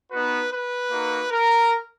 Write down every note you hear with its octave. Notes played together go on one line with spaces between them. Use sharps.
B3 D#4 F#4 B4
B4
A#3 D#4 F#4
A#4